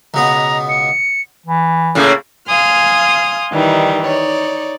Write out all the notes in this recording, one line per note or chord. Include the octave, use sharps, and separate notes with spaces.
C#2 B2 B3 A#5
C#7
E3
A2 C#3 A#3
F5 G#5 C6 D#6 F6
D#3 E3 G3 D#4
D#4 C#5 D5